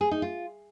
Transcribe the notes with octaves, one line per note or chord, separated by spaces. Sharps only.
G#4
D#4
F4